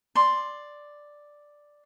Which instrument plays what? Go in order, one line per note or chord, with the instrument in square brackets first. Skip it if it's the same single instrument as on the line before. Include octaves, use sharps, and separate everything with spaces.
[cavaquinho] D5 C6